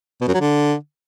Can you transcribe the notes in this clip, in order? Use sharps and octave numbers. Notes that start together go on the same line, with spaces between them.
B2
F#2
F#3
D3